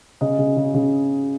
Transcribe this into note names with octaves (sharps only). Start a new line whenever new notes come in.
C#3 D#5
C#3
C#3
C#3